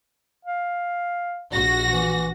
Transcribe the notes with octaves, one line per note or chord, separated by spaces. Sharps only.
F5
A#1 F#4 A#6
E3